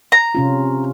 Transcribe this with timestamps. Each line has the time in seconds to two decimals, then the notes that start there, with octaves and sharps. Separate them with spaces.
0.12 A#5
0.35 C3 C#4 F4